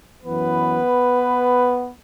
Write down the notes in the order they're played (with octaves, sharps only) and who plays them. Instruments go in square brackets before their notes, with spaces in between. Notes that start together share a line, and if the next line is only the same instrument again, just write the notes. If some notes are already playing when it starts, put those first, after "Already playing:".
[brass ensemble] F#2 E3 B3 B4